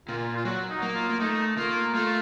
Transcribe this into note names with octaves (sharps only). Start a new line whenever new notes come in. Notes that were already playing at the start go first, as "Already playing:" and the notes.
A#2 F4
F4
F#3 F#4
D#4
A#3
F4
A#3
A3 D#4
A#3 F4
A3 F4